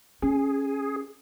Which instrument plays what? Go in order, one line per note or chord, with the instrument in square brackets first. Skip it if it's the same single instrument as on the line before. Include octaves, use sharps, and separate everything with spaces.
[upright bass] C#4 [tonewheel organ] G#4